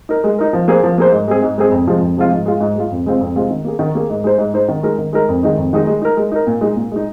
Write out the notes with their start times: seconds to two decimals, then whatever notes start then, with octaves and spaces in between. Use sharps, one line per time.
0.09 D#4 A#4
0.24 G#3
0.38 D#4 A#4
0.53 F3
0.68 A#3 G#4 C5
0.83 F3
0.98 A#3 G#4 C5
1.12 G#2
1.28 G#3 C4 G#4
1.43 G#2
1.58 G#3 C4 G#4
1.72 F2
1.86 C3 F3 G#3 F4
2.01 F2
2.17 C3 F3 G#3 F4
2.31 G#2
2.46 G#3 F4
2.60 G#2
2.75 G#3 F4
2.91 F2
3.06 C3 G#3 C4 F4
3.21 F2
3.35 C3 G#3 C4 F4
3.50 D#3
3.65 A#3 G#4
3.79 D#3
3.95 A#3 G#4
4.10 G#2
4.24 G#3 D#4 C5
4.38 G#2
4.54 G#3 D#4 C5
4.69 D#3
4.83 G#3 D#4 A#4
4.98 D#3
5.13 G#3 D#4 A#4
5.28 F2
5.43 D#3 G#3 D#4
5.57 F2
5.73 D#3 G#3 D#4
5.87 G#3
6.02 D#4 A#4
6.17 G#3
6.32 D#4 A#4
6.47 A#2
6.61 G#3 D#4
6.76 A#2
6.92 G#3 D#4